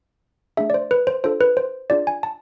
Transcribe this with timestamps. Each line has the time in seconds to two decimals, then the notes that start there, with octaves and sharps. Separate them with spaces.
0.57 A3 D4 G#4 E5
0.70 D5
0.74 C5
0.91 B4
1.07 C5
1.24 D4 F4 A4 C5
1.41 B4
1.57 C5
1.90 D4 F4 G#4 D5
2.07 G#5
2.23 A5